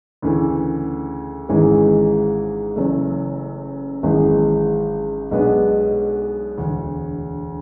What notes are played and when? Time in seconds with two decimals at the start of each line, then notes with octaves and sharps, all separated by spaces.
0.22 D2 C#3 E3 A3
1.49 G#1 G#2 E3 G#3 C#4
2.76 F#1 F#2 E3 A3
4.03 G#1 F#2 E3 G#3
5.31 B1 B2 G#3 B3 D4
6.58 E1 D2 D3